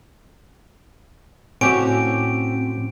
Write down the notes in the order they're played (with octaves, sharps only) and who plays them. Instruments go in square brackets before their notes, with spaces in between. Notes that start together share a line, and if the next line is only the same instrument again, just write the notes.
[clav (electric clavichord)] A2 F#4 [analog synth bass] C4 [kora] C#4 G4 E5 [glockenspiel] D7